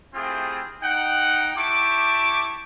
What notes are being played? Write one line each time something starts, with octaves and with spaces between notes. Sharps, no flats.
A3 C4 E4 F4 G4 G#4
D#4 F#5 G5
E4 G4 A5 C#6 D6